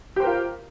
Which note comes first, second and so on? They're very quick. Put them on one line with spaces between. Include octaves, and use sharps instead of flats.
G4 C5 A#4 F4